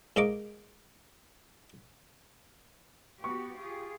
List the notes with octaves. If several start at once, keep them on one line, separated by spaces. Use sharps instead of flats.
G#2 A#3 D#5 C#6 D6
B3 F#4 G4 C#6
F4 G4 G#4